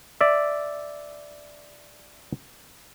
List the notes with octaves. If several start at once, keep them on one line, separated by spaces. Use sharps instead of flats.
D5 E5